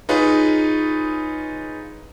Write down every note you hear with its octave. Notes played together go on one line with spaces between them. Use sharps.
D#4 F4 G#4 B4 C#5